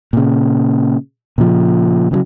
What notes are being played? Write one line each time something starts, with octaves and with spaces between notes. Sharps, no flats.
A#2 C#3
A#2 C#3 F3
C#3 E3 F#3